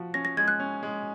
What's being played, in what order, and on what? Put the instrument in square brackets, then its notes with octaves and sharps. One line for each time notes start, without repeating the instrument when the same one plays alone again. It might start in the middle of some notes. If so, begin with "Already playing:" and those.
Already playing: [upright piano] F3 F#4
[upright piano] C#4 [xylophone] A#6
[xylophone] A#6
[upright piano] G#3 [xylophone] G#6
[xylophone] F#6
[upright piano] C#4
G#3